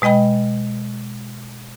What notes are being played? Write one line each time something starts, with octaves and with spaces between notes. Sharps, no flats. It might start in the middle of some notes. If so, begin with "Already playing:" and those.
B2 G#3 D#5 G5 B5